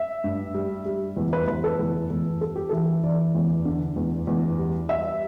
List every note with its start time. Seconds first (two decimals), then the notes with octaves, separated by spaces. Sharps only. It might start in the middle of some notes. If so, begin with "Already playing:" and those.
Already playing: E5
0.24 G2
0.54 G3
0.86 G3
1.17 E2
1.33 B4
1.48 E2 B4
1.64 A4
1.79 E2
2.10 E2
2.41 G3 A4
2.56 G4
2.69 E3 A4
3.03 E3 D5
3.35 E2
3.65 D3
3.96 E2
4.27 E2
4.58 G3
4.89 G3 E5